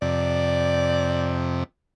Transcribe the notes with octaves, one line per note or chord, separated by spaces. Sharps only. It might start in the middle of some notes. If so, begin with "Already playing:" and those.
F2 C3 D5